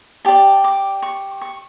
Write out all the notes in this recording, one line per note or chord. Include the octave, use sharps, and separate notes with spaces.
G4 D5 A5
D6
C#6
C#6